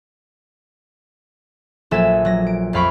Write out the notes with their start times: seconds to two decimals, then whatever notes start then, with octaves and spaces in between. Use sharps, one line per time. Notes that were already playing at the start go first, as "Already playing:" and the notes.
1.91 A#1 F#3 A4 E5 G#5 E7
2.25 F#3 A#6
2.47 D7
2.73 F2 A3 F5 B5 C#6 D7